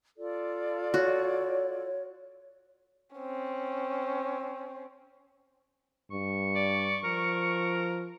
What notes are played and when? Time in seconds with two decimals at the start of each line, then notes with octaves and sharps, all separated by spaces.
0.18 F4 A4 D5
0.94 F#4 C#5
3.16 C4 C#4
6.11 G2 C#6
6.56 D5
7.04 F3 A#4